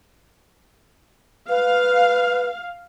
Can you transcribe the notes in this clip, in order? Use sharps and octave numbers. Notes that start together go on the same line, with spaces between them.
B4 F5